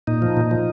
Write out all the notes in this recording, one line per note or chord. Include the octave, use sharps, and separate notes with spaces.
A#2 D#4
F3
A#2
F3